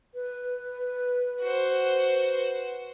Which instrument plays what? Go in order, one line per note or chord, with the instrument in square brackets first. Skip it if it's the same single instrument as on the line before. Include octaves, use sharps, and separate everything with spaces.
[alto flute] B4
[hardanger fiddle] F#4 C5